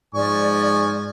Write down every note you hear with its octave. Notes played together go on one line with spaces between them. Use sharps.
G#2 F3 D5 G#5 C#6